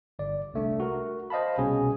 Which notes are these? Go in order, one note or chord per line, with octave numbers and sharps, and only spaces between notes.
G1 D5
C2 A3 D4
F#4 A#4
C5 D#5 F5 A5 B5
C2 B2 C#4 G#4 G#5